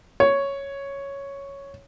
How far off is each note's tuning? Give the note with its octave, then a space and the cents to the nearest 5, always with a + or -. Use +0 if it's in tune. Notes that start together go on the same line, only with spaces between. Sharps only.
C#5 +0